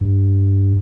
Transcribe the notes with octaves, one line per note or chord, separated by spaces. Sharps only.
G2